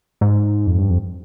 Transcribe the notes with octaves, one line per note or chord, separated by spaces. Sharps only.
G#2
F2
G2
F2